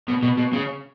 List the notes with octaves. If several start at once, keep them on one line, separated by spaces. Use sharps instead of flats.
B2
B2
B2
C#3